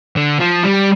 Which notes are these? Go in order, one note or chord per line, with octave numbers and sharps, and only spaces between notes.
D3
F3
G3